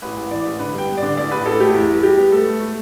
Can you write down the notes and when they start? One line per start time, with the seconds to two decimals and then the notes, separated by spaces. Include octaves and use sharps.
0.02 A1 B4
0.16 A1
0.31 E3 D5
0.46 A1
0.59 D3 B4
0.74 G2 G5
0.88 B3
0.97 D5
1.03 D3
1.17 A1 D5
1.31 A1 B4
1.45 A1 A4
1.60 A3 G4
1.74 E2 E4
1.89 G3
2.03 G3 G4
2.17 B3
2.32 A3 A4
2.46 A3
2.60 A3